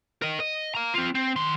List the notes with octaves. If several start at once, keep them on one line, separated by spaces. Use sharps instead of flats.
A#4 D#5
D#5
F5 A#5
C4 F4
C4
D#3 C6